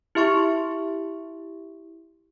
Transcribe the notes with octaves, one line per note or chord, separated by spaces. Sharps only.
E4 G4 E5 C6 C#6